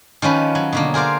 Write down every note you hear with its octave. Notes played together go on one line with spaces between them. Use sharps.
D#3 F3 C#4 B4
F#3
B2 D3 A#3
G#4 A#4 C5 D5 F5